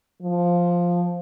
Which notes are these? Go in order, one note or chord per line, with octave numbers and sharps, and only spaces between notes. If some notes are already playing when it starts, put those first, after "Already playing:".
F3